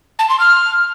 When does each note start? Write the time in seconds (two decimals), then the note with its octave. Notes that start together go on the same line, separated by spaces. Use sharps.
0.19 A5
0.29 C6
0.40 F6